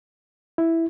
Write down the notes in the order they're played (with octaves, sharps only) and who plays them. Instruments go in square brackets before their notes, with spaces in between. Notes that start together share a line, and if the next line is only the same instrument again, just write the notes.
[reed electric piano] E4